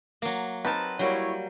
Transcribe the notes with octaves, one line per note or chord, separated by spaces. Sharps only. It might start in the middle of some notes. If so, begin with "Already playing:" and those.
F#3 A#3
C4 D#4 A#4 B4 A5
F#3 G3 A#3 E4 C#5